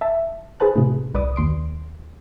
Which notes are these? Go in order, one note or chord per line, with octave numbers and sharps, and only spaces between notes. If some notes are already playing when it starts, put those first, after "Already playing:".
E5 A5
G#4 B4 C5 A5 F#6
A2 C3
C2 B4 D5 D6 D#6
D#2 C6 D7